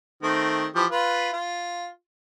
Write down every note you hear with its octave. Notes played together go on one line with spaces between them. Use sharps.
D#3 A3 C4
E3 F3 G4
F4 B4
F4